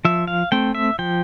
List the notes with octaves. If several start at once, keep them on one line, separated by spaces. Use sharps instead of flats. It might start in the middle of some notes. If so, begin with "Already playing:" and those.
F3 E5
F5
A3 C4 G5
E5
F3 G5